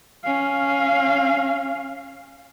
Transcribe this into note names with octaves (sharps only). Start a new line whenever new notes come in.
C#4 F5